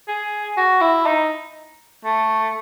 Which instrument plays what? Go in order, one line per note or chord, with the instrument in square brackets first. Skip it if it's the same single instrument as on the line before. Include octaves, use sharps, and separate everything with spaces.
[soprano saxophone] G#4
F#4
E4
D#4
A3